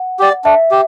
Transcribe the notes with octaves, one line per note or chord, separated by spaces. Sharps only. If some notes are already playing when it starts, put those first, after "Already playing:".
Already playing: F#5
G4 D5
D4 E5
G4